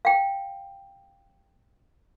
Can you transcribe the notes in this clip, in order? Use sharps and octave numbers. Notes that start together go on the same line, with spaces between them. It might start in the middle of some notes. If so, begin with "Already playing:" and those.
F5 G5